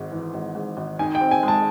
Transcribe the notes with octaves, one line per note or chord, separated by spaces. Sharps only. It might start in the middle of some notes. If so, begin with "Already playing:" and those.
Already playing: G#1 G#2
E3
G#1
G#2
G#1
D#3 G#5
G5
C4
G#5
G#3
A5